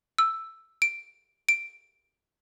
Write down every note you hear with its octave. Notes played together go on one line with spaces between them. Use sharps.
E6
D7
D7